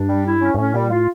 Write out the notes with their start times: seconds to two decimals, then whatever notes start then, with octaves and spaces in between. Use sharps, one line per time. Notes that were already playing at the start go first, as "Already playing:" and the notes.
Already playing: G2 D4
0.09 G3
0.26 E4
0.42 C#4
0.54 G2
0.58 A2 C#4
0.74 A#2 G3
0.90 A2 F4